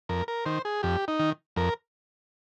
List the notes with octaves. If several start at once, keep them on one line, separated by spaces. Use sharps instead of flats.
F2 A#4
A#4
D#3 C5
G#4
F2 G4
D#4
D#3
F2 A#4